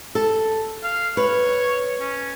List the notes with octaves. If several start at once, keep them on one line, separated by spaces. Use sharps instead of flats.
A4
F5
B4 C#5
C#4